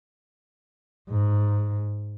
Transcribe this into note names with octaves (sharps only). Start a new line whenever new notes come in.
G#2